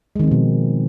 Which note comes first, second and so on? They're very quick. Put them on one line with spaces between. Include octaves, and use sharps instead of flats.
G#3 D#3 C4 F3 B2